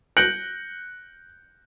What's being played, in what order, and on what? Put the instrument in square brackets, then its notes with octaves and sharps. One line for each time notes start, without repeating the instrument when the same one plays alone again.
[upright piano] F#6 G6 A#6 C#7 D7 F#7